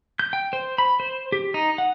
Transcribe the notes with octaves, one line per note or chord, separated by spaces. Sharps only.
G6
G5
C5
B5
C5
G4
D#4
F#5